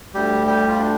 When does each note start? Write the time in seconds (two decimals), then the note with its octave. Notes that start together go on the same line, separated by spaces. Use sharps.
0.14 D2 D3 G3 G4
0.47 G3 G4
0.68 F4
0.79 D4